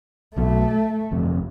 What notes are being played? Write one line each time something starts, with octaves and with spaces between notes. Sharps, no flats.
B1 B2 F#3 A3
G1 F2 C3